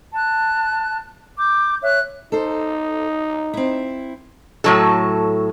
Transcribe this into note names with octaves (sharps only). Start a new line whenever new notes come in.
A5 F#6
D6 G6
C#5 E5 F#6
D#4 A4 C5
C4 E4
A2 F#3 A4